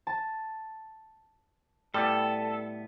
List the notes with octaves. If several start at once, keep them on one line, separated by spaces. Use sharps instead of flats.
A5
A2 G3 B3 A4